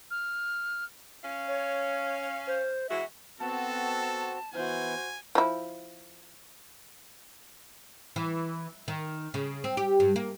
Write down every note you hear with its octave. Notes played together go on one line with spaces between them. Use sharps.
F6
C#4 F5
C#5
C5
E3 G#3 F#4 E5
B3 C4 F#4 A4 A5
E3 B3 E4 F#4 C5 G#5
F3 E4
E3
D#3
C#3
C4
G4
G2
A#3